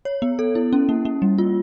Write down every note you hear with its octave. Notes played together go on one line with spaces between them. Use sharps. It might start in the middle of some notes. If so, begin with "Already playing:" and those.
C#5
B3
A4
E4
C#4
A#3
A#3
G3
F4